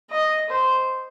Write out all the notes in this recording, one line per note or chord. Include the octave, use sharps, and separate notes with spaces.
D#5
C5